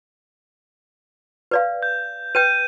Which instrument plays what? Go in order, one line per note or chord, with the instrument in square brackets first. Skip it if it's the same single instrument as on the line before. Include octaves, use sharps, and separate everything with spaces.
[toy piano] B4 D5 F5
[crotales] G6
[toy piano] B4 G5 [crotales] G6 D#7